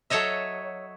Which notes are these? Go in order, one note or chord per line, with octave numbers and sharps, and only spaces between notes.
F#3 A4 C#5 D#5 E5